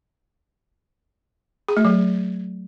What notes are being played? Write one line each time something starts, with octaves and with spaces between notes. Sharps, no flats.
G#4
A3
F#3